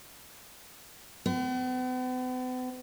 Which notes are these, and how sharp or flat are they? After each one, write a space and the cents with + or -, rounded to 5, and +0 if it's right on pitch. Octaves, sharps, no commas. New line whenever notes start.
B3 +45